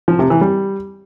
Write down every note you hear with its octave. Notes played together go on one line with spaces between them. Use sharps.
F3
C3
E3
G3